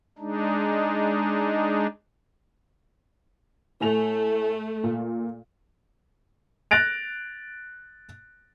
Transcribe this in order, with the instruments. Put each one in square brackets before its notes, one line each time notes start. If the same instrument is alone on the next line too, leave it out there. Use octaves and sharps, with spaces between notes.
[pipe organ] G#3 D4 D#4
[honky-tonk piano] A2 G#5 F7 [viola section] A3
[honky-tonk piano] A#2
[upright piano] F#6 A6 A#6 D7 F7